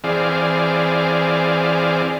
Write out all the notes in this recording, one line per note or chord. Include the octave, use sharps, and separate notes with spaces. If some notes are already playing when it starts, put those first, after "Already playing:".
E3 C4 G#4 D5 F5